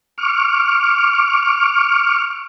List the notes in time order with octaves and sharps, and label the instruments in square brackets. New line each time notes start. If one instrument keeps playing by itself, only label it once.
[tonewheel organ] C#6 D6 F6